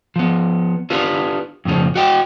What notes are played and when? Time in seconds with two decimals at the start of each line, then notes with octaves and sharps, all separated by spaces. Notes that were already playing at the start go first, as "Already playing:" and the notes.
0.16 F3 B3
0.90 D4 F4 G4 B4
1.65 F2 A2 C#3 F3
1.96 F#4 D#5 G5